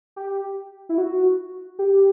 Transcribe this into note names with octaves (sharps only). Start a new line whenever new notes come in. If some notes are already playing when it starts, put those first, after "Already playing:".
G4
E4
F#4
G4